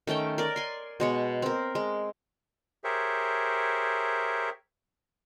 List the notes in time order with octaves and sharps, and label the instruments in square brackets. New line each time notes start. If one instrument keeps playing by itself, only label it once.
[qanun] D#3 A3 C#4 G5
A#4 D5
G#5 C6
B2 G#3 C#5
C4 A#4
G#3
[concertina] G4 G#4 A#4 C5 C#5 E5